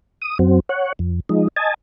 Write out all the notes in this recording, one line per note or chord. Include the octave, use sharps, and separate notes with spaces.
D#6
F#2 F#3 C4
C#5 F#5
F2
F3 G#3 D#4
D#5 G#5 A5